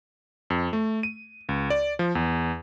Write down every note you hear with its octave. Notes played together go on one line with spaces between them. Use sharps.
F2
A3
D#7
C#2
D5
F3
E2